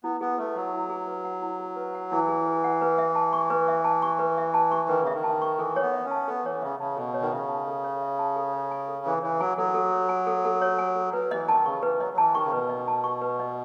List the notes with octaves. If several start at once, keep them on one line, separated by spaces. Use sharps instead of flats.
B3 E4
B3 G#4
A3 B4
F#3 F#5
E4
G#4
B4
F#5
E4
G#4
B4
F#5
E3 E4
G#4
B4
F#5
B4
E5
A5
C#6
B4
E5
A5
C#6
B4
E5
A5
C#6
D#3 B4
C#3
E5
D#3
A5
C#6
E3 A4
C#5
B3
E5
C#4
A5
B3 A4
E3 C#5
C#3 E5
C#3 A5
B2 A4
C#5
D#3
C#3 E5
A5
A4
C#5
E5
A5
A4
C#5
G#5
A4
E3 A4
E3 C#5
F#3 G#5
F#3 A4
A4
C#5
G#5
A4
A4
C#5
G#5
A4
F#3 B4
E3 D#5
D#3 A5
C#3 C#6
E3 B4
F#3 D#5
F#3
E3 A5
D#3 C#6
C#3
B2 B4
D#5
A5
C#6
B4
D#5